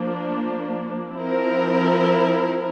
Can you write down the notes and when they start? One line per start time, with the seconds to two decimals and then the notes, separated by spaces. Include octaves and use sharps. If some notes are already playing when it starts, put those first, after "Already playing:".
Already playing: F3 A#3 D4
1.17 F3 C4 E4 A#4